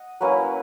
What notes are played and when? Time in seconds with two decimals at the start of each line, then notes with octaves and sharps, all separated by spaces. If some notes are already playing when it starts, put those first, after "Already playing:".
Already playing: D#5 F#5
0.21 F#3 A#3 C#4 E4 B4